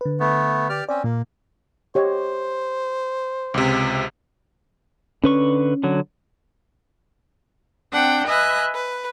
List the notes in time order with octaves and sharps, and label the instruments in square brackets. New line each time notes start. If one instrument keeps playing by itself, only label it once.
[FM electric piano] D3 B4
[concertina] A3 B3
G4 D5 F6
[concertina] C4 C#4 [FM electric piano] D5
[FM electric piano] A#2 [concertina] A#3
[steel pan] G4 C#5 D#5 [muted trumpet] C5
[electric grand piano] C#2 C3
[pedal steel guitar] D3 B4 C#6 [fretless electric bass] C#4
[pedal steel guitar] D3 F#3
[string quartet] C4 D4 F#5 G5
B4 D#5 E5 G#5 F#6
B4